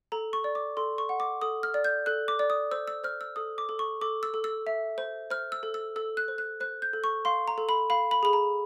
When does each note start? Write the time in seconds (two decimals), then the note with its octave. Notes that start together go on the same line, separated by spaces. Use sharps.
0.12 A4 A#5
0.33 C#6
0.44 D5
0.55 D6
0.77 A4 C6
0.98 C#6
1.09 F#5
1.20 D6
1.41 A4 D#6
1.63 F6
1.74 D5
1.84 G6
2.06 A4 F#6
2.28 D6
2.39 D5
2.50 D#6
2.71 C5 E6
2.88 E6
3.04 C5 F6
3.21 E6
3.36 A4 D#6
3.58 D6
3.69 A4
3.79 C#6
4.01 A4 D6
4.23 E6
4.34 A4
4.44 E6
4.67 E5
4.98 C5
5.30 C5 F6
5.52 E6
5.63 A4
5.74 E6
5.96 A4 E6
6.17 F#6
6.28 C5
6.38 F#6
6.60 C5 F#6
6.82 G6
6.93 A4
7.04 C#6
7.25 F5 C6
7.48 A#5
7.58 A4
7.69 B5
7.90 F5 B5
8.11 B5
8.23 G#4 B5
8.33 A#5